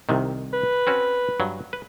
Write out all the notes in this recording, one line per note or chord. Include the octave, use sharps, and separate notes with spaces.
C2 C3 D#3
B4
C4 C#4 F#4
G2 F#3
B4